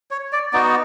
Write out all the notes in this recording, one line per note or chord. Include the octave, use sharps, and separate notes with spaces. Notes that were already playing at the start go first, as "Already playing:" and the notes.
C#5
D5
B3 D#4 F#4 D5